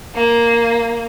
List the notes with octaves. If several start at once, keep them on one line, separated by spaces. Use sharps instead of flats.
A#3